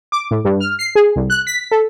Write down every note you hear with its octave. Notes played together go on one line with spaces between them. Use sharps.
D6
A2
G2
F6
C7
G#4
C2
F#6
B6
A4